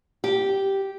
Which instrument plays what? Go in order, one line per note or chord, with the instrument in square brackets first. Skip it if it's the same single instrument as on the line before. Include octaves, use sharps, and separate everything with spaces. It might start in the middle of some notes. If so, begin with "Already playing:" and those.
[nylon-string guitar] G4